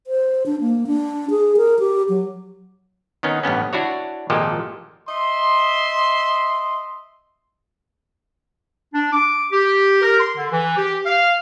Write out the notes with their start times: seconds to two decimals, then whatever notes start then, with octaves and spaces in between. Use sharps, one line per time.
0.07 C5
0.46 D4
0.61 A#3
0.87 D4
1.30 G#4
1.57 A#4
1.79 G4
2.09 F#3
3.23 D#3 B3 C#4 D#4
3.43 A1 G2 B3 C#4
3.73 D4 E4 F#4 C#5
4.30 G#1 A#2 F3 G#3 G4 A4
5.08 D#5 E5 C6
8.94 D4
9.13 D6
9.52 G4
10.02 A#4
10.19 C6
10.37 D3
10.51 E3
10.77 G4
11.06 F5